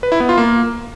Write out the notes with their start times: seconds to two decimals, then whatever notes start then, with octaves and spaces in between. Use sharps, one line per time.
0.03 B4
0.12 E4
0.20 B3
0.29 F4
0.38 A#3